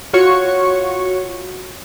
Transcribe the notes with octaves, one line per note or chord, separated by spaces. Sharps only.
F4 F#4 C#5 C#6